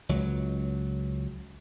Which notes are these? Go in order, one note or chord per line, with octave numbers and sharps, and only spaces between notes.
C#2 F#3